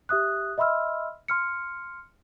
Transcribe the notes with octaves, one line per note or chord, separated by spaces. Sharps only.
G4 E5 D#6 F#6
D#5 E5 B5 C6 E6 F6
C6 F6 C#7